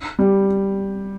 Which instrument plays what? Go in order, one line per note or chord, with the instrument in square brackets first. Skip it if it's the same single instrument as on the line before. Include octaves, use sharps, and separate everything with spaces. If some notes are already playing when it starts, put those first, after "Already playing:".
[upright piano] G3